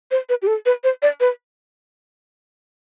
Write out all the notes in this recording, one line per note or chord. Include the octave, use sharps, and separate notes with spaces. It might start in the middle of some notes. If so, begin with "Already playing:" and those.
C5
B4
G4
A4
B4
C5
D5
B4